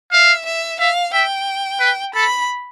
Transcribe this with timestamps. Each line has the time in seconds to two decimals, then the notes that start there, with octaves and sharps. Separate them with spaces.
0.13 E5 F5
0.46 E5
0.80 E5 F5
1.13 E5 G5
1.80 B4
2.14 A4 B5